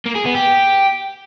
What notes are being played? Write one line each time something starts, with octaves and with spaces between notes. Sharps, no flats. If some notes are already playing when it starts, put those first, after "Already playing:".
A#3
G#4
B3
G4